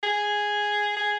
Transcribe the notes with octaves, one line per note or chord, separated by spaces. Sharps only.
G#4
G#4